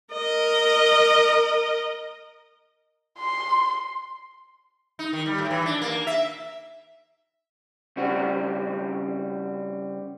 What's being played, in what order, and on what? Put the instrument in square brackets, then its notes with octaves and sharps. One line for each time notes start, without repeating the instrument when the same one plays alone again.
[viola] A#4 D#5
[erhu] C6
[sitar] D#4
D#3
G3
A2
E3
D4
A#3
E5
[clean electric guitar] C#3 G3 C4 F#4